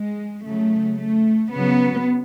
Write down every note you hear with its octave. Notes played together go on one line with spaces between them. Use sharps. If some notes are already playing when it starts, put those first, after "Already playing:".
Already playing: G#3
C#3 F#3 A3
A3
C#3 F#3 B3